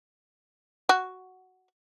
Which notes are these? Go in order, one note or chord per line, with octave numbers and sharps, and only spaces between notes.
F#4